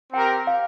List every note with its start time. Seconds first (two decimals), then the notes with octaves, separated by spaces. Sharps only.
0.13 C4 G4 A#4 G5
0.47 F5